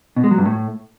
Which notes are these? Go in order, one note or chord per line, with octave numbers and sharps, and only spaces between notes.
B2
G#3
F#3
G2
A2